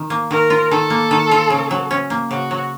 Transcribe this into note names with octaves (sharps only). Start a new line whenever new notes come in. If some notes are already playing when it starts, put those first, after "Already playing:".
Already playing: D#3
A#3
D#3 A#4
F4
D#3 A4
A#3
D#3
F4
C#3
F#3
C#4
A#3
C#3 F#4
F#3